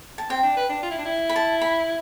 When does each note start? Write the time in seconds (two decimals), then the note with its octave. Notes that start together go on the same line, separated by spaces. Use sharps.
0.18 A5
0.30 C4 G5
0.43 D4
0.57 B4
0.69 D4
0.83 F4
0.90 E4
0.98 D4
1.05 E4
1.29 B5
1.36 A5
1.61 B5